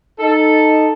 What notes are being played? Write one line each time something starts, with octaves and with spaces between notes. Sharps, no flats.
D#4 A4